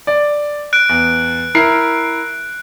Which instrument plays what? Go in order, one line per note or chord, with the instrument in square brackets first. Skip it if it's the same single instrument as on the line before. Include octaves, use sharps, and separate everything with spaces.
[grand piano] D5
[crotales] F#6 D7
[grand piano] E2
E4 A#4 C7